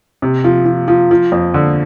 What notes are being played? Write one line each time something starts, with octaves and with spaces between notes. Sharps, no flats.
C3
F3
F3
F3
F3
F2
D3